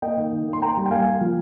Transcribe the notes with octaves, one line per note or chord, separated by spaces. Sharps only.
A#3 D#5 G5
D#3
D#3
A#3
C6
A#3 G5 A#5
G3
G5
A#3 F5 G#5
A#3
F3